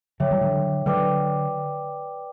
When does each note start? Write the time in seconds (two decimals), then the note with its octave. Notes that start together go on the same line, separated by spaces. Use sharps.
0.20 D3 F#3 C#5 E5 G5 D6
0.31 E3 G3
0.41 D3 F#3
0.86 D3 F#3 B4 D5 G5 D6